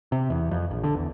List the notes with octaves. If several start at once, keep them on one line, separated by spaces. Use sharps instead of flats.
C3
E2
F2
A#1
D3
E2